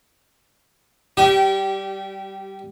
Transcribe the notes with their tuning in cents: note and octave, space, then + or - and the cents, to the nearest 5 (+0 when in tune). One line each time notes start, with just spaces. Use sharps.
G3 -10 G4 -30 G5 -20